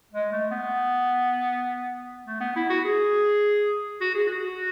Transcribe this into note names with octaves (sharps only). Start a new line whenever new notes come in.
G#3
A3
B3
A3
B3
E4
F#4
G#4
F#4
G#4
F#4